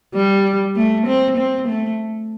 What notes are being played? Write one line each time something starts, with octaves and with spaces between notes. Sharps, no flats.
G3
A3
C4
C4
A3